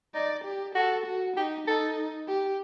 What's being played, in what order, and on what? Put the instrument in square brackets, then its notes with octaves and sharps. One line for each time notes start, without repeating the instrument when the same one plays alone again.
[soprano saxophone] D#4 [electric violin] D5
[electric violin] G4
[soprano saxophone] F#4 [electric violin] A4
[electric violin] F#4
[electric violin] D#4 [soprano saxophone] G4
[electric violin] D#4 [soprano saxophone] A4
[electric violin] G4